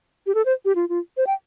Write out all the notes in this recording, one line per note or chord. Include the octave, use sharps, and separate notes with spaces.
G4
A4
C5
G4
F4
F4
C5
G5